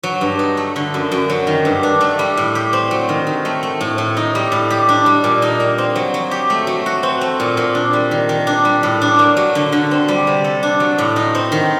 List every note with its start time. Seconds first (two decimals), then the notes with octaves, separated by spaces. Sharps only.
0.03 F#3
0.21 G2
0.39 D#4
0.57 A3
0.76 D3
0.94 F#2
1.12 F#2
1.30 F#3
1.47 D#3
1.65 G2
1.83 D4
2.01 A3
2.19 G3
2.37 A2
2.55 G4
2.73 C4
2.91 F#3
3.09 D#3
3.27 D#3
3.45 A3
3.63 A3
3.81 A2
3.98 A2
4.17 D#4
4.35 G3
4.52 A2
4.70 G4
4.89 D4
5.06 G3
5.24 A#2
5.42 D#4
5.60 A#3
5.78 C4
5.96 F#3
6.14 F#3
6.31 G4
6.50 A3
6.67 F#3
6.86 F#4
7.03 C4
7.21 A3
7.40 A#2
7.57 A#2
7.75 D4
7.93 G3
8.11 D#3
8.29 D#3
8.47 D4
8.65 G3
8.83 A2
9.02 D4
9.19 A#3
9.37 F#3
9.55 D3
9.72 D3
9.91 C4
10.08 G3
10.27 C3
10.44 A4
10.63 D4
10.80 F#3
10.98 A2
11.16 D#4
11.35 C4
11.52 D#3